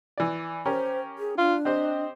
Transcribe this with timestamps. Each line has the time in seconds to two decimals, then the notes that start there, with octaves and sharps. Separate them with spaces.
0.18 E3 D5
0.66 C#4 G4 A#4 C5
1.18 G#4
1.38 D4 F4
1.65 C4 G4 C5 D#5